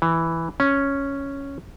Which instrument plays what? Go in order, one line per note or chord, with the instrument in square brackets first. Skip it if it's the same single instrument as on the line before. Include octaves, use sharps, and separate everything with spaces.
[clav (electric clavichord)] E3
C#4